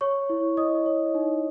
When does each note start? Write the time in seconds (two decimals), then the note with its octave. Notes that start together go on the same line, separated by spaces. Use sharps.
0.01 C#5 C#6
0.29 E4
0.57 E4 D#5 D#6
0.86 C#5
1.15 D#4